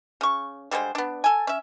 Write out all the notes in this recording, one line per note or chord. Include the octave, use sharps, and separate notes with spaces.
C#3 C#6
D3 G3 G#3 C5
B3 D4
A4 G#5
C#4 E5